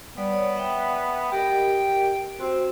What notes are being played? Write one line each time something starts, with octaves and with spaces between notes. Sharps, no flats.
G3 B3 D5
C#5 D5
E5 F#5 G5
G4 A#4 D#5 G5
C4 F#4 C5